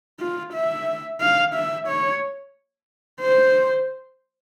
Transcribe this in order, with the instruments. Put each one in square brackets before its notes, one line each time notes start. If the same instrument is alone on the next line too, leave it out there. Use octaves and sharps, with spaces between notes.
[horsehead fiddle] F4
E5
F5
E5
C#5
C5